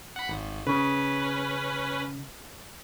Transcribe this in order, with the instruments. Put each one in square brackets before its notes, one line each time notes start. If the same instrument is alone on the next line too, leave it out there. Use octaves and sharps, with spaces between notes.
[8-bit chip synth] F#5 B5
G#1
[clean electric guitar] C#3 [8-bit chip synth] C#4 B4